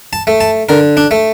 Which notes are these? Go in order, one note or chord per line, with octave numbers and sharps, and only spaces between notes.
A5
A3
A5
D3 A#4
D4
A3